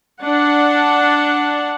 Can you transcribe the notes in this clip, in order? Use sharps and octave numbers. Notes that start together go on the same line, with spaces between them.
D4 F#5